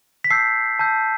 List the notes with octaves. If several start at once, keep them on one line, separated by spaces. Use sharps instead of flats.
B6
A5 E6 G6 C7
A5 E6 G6